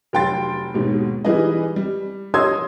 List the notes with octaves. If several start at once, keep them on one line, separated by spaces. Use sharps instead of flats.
F1 F#3 G5 C6 A6
D#2 G#2 B2
E3 G3 D#4 G#4 B4 D#5
G3
C#5 D#5 C6 D#6 E6 G#6